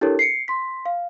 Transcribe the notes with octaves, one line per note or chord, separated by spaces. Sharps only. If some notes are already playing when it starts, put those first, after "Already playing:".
D4 E4 G4 A4 A#4 C#5
C7 C#7
C6 B6
F5